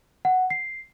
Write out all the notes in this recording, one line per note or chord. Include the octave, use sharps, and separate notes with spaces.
F#5
C7